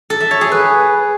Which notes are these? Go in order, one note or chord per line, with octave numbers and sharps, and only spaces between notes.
A4
E5
C#5
G#4
B4